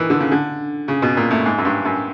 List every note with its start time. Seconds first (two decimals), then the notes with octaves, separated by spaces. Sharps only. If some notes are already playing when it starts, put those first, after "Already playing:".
Already playing: D#3 E3
0.10 D3
0.20 C#3
0.31 D3
0.88 C#3
1.02 B2
1.17 A#2
1.31 A2
1.45 G#2
1.58 F#2
1.65 G2
1.85 F#2